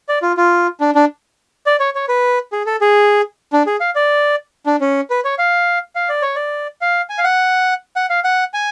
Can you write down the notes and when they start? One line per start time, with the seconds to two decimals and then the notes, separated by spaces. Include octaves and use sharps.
0.09 D5
0.22 F4
0.37 F4
0.80 D4
0.95 D4
1.66 D5
1.80 C#5
1.95 C#5
2.09 B4
2.52 G#4
2.66 A4
2.81 G#4
3.53 D4
3.66 G#4
3.80 F5
3.95 D5
4.66 D4
4.81 C#4
5.10 B4
5.25 C#5
5.38 F5
5.95 F5
6.09 D5
6.22 C#5
6.35 D5
6.81 F5
7.10 G#5
7.18 F5
7.24 F#5
7.96 F#5
8.10 F5
8.24 F#5
8.54 G#5